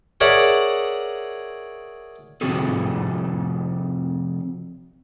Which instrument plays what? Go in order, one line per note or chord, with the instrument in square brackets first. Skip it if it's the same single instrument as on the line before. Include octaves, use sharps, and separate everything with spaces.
[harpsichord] G#4 A#4 C#5 D5 E5 F#5
[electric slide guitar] C3 F3 C4 F#4 G#4 A4